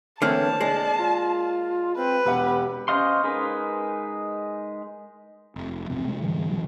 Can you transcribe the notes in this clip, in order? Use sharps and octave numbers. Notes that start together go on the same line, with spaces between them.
D3 E3 A#3 C4 C#5 A5 F6
G#3 D5
F4
C4 B4
E1 G4 F#5
C#4 C5 D#5 F5 C6
G#3 D#4 G#4 A#4 B4
F1
A1 E2 C3 C4
C3 G#3
G#2 D3 E3 G3
C#2 C3 E3 F#3